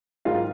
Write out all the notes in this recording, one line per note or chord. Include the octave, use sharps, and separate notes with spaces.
G#2 D#3 F#3 A#3 F4 F5